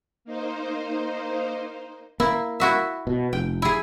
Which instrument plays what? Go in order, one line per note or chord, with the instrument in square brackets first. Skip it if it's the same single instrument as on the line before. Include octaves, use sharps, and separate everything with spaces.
[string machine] A#3 D#4 C5
[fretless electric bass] A#3 [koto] E4
[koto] E4 F#4 E5
[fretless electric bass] B2
[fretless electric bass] F1 [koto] G5
[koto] E4 G#4